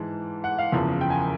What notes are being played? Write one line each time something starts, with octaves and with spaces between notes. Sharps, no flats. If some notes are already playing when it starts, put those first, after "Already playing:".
Already playing: G#2 E3 G#3 A5
F#5
F5
F#1 E2 C#3 F3
G5
G#5